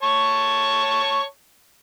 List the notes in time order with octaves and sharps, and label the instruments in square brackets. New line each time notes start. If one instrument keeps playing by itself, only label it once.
[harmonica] C#5 A5 C#6